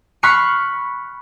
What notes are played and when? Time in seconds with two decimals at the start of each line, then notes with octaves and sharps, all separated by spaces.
0.23 B5 C#6 F6 F#6 C7 C#7